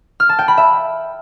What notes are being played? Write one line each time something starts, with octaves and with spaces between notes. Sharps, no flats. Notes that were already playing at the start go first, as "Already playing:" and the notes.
F6
A5
G5
B5
E5